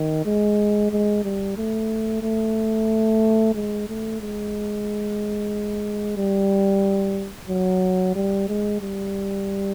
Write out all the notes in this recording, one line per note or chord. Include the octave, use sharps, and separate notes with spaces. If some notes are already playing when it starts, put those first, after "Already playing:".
Already playing: D#3
G#3
G#3
G3
A3
A3
G#3
A3
G#3
G3
F#3
G3
G#3
G3